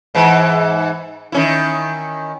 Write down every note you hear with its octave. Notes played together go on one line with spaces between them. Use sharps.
G#2 E3
D#3 C#4 E4